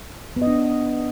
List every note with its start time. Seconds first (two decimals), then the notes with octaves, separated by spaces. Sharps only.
0.36 B3
0.42 D#5
0.47 D4